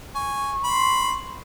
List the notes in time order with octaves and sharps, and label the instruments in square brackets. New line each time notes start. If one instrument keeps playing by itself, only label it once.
[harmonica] G#5 [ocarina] C#6
[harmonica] B5 [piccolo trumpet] C6